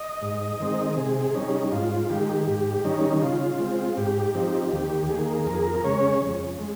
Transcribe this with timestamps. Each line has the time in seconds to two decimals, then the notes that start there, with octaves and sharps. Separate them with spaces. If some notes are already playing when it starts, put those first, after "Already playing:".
Already playing: D#5
0.22 G#2
0.60 D#3 G#3 C4
0.97 C3 G#4
1.35 G3 C#4 D#4
1.72 G#2 F4
2.10 D#3 G#3 G4
2.47 G#2 G4
2.84 D#3 G3 C#4 D#4
3.22 C#3 F4
3.60 G#3 C4
3.97 G#2 G4
4.35 F3 C4 D#4
4.72 D#2 G4
5.09 D#3 A#3 G#4
5.46 F2 A#4
5.55 G#4
5.62 A#4
5.84 C#3 G#3 C#4 C#5
6.22 F2
6.60 G#3